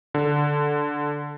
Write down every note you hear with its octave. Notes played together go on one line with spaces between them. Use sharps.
D3